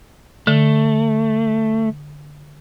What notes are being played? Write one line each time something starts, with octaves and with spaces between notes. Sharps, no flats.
D3 A3